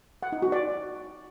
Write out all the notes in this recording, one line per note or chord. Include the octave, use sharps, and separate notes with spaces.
F#5
D#4
F#4
D5